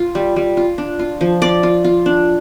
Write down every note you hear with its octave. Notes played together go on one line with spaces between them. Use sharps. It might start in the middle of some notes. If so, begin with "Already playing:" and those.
Already playing: F4
G3
G3
F4
D4
F4
F3
F4 D5
F4
F4
D4